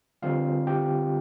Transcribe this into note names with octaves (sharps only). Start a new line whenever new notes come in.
D3 G3 C4 F4 F5
G4 G5